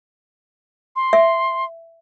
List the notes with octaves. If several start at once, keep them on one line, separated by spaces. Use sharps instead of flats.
C6
E5